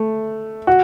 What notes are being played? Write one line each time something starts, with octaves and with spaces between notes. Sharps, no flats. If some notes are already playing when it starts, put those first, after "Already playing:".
Already playing: A3
F#4